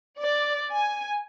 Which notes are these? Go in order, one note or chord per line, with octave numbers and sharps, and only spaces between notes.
D5
G#5